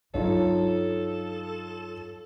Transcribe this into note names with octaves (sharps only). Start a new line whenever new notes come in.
G2 F#3 D#4 F4 A4 C#5